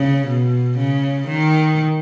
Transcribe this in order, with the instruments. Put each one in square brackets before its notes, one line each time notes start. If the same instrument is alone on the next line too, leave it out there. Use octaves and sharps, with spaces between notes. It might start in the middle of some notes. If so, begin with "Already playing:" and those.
Already playing: [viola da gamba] C#3
B2
C#3
D#3